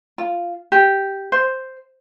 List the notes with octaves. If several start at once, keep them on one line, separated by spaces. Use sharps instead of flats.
F4
G4
C5